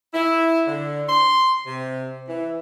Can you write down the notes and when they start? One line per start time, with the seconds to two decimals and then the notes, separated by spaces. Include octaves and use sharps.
0.13 E4
0.67 D3
1.08 C6
1.66 C3
2.28 E3